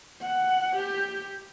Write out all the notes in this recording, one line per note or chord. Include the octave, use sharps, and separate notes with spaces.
F#5
G4